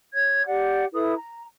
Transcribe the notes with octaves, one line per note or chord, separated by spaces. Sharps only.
C#5 G#6
G4 D5 F#5
E4 A4 B4 D#6
A#5